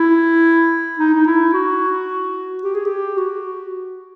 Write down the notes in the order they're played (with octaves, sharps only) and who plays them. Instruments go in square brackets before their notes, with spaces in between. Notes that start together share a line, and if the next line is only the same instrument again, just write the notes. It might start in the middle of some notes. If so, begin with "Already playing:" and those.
Already playing: [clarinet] E4
D#4
D#4
E4
F#4
G4
G#4
G4
F#4